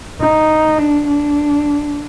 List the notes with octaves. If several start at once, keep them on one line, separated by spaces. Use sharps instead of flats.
D#4
D4
D4